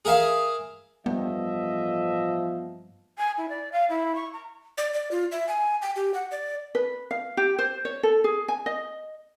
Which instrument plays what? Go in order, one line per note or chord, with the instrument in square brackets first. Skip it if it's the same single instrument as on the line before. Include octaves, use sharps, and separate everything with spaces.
[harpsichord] G#4 A#4 E5 F5
[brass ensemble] A1 D#5 E5 [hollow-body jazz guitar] G2 [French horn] F3 [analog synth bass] B3
[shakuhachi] G#5
E4
D5
F5
E4
C#6
A#5
[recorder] D5
D5
F4
E5
G#5
G5
G4
F#5
D5
[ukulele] B4
F5
G4
C5
C#5
A4
G#4
G#5
D#5